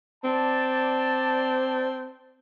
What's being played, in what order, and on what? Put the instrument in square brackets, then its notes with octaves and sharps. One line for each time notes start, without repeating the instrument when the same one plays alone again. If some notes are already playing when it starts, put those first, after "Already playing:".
[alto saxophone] C4 [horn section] D5 A5